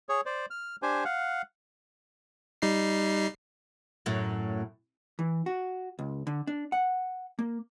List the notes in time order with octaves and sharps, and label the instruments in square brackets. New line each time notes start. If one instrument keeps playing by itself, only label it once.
[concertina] G#4 C#5
C5 D5
F6
D4 G4 C5 G#5
F5 F#5
[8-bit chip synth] G3 D#4 C7
[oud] F#2 A2 F#3
[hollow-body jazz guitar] E3
F#4
C#2
D3
D4
F#5
A#3